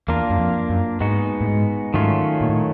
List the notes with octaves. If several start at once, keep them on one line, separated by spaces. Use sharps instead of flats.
E2 A#3 D4 F4 A#4
F#2
F2
F#2
G#2 G#3 B3 D#4 F#4
A2
G#2
G#2 D#3 F#3 A3 C#4 F4
A#2
A2